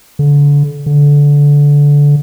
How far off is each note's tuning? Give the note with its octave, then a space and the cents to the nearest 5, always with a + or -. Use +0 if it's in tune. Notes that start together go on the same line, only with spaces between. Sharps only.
D3 -30
D3 -20